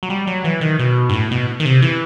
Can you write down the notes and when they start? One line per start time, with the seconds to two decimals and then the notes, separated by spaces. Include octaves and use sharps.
0.03 F#3
0.10 G3
0.27 F#3
0.44 E3
0.61 D#3
0.79 B2
1.09 G2
1.13 A2
1.31 B2
1.60 D#3
1.65 C3
1.82 E3